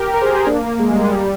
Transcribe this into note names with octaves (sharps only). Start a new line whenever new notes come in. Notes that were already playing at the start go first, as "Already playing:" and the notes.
Already playing: G4 A#4
G4 A#4
G#4 C5
G4 A#4
G#4 C5
A#3 D4
G#3
G3
G#3
G3 A#3